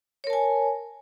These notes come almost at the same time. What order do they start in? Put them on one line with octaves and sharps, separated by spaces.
C#5 A#4 A5 G#5